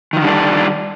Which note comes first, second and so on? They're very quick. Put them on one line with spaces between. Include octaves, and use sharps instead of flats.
D#3 F3 D3 G3 D4